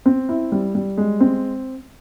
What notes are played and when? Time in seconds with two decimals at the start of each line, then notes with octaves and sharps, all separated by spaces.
0.06 C4
0.29 E4
0.52 G3
0.75 G3
0.97 G#3
1.20 C4